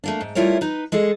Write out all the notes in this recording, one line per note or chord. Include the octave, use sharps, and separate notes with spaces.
A3 A#3 D4
G#2
G3 A3 E4 F4 A#4 C#5
D#4 B4
G#3 G#4 A4 D#5